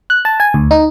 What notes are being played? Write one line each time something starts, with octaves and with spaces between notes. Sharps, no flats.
F#6
A5
G#5
D2
D#4